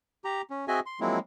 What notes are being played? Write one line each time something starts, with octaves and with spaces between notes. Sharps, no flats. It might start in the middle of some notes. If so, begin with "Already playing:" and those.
G4 A#5
C#4
C4 F#4 G#4 D#5 E5 G#5
C6
F3 F#3 G#3 A#3 C4 E4